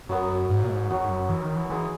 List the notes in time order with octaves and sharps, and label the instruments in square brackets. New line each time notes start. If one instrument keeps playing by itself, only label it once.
[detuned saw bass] F#2 [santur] F#3 B3 F#4 A#4
[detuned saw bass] G#2
A#2
G#2
[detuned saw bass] E2 [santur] D#4 F#4 C#5
[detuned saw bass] G#2
F#2
E3
D#3
E3
[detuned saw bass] E3 [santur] G#3 B3 D#4 G#4